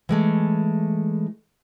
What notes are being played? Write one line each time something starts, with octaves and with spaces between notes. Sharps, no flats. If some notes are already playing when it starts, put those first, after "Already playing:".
E3 G#3 A3